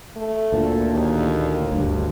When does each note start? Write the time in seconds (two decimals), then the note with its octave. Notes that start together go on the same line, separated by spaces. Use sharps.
0.16 A3
0.52 D2 A#2
0.90 D#2
1.72 D2 G2